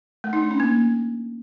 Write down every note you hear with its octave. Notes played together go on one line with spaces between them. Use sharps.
A3
D#4
D4
C#4
A#3